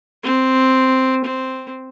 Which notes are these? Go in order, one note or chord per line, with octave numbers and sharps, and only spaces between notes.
C4
C4